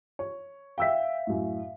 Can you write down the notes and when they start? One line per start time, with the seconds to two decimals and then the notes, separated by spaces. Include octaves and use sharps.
0.19 C#5
0.78 E5 F5 G5 E6 B6
1.27 F#2 A2